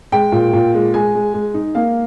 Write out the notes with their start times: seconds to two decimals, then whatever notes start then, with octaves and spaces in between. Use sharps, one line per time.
0.12 G#3 G5
0.32 A#2
0.53 A#2
0.74 G#3
0.94 G#3 G#5
1.15 G#3
1.34 G#3
1.54 D#4
1.75 A#3 F5